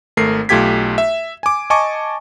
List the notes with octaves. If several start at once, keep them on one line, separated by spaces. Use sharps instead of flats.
G#1 A3 A#4 C7
B1 A3 F4 G4 G#6 B6
E5
G#5 D6
D#5 G#5 A5 C#6 D6